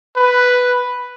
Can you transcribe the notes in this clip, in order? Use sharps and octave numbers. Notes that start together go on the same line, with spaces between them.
B4